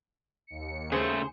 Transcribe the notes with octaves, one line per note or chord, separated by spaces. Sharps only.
D#2 C#7
C#3 A3 G#4 C5